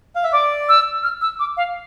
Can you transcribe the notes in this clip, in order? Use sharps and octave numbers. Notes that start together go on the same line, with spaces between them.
F5
E5
D5 D6
E6
F6
E6
D6
F5